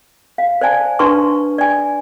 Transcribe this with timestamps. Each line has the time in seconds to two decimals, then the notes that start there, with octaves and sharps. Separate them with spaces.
0.38 F5
0.61 C5 D5 G#5 A5
0.99 D4 B4 A5 C6 C#6
1.58 D5 G#5